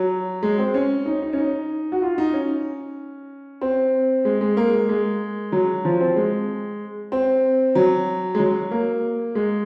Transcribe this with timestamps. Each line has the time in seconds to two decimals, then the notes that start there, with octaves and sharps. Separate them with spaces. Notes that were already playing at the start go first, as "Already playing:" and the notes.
Already playing: F#3
0.43 G#3
0.58 C4
0.74 C#4
1.06 D#4
1.22 D#4
1.33 C#4
1.38 D#4
1.92 F#4
2.02 F4
2.18 D#4
2.33 C#4
3.61 C4
4.25 G#3
4.41 G#3
4.57 A#3
4.73 G#3
4.89 G#3
5.52 F#3
5.85 F3
6.00 C4
6.16 G#3
7.12 C4
7.75 F#3
8.35 G#3
8.40 F#3
8.71 A#3
9.35 G#3